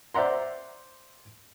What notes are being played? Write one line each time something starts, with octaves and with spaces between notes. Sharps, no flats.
C5 D5 E5 F#5 A#5 C6